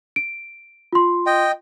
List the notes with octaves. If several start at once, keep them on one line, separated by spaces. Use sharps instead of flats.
D7
F4 C6
D#5 G5